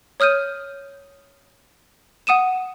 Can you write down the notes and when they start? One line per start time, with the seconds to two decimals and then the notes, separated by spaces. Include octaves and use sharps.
0.20 C#5 D#6 F6 G6 D#7
2.27 F#5 D#6 D#7 E7